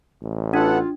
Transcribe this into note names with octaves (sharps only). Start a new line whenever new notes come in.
A1
B3 D4 F4 A4 F#5